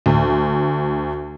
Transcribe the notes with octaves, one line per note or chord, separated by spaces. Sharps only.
D2